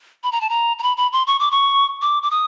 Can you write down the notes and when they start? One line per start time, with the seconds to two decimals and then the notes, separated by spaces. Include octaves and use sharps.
0.23 B5
0.32 A#5
0.41 A5
0.49 A#5
0.79 A#5
0.83 B5
0.97 B5
1.13 C6
1.27 C#6
1.40 D6
1.51 C#6
2.02 D6
2.23 D6
2.31 D#6